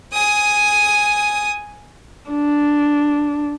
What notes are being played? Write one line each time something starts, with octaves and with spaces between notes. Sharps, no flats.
G#5 D#6
D4